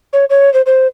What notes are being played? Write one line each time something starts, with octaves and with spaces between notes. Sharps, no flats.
C#5
C#5
C5
C5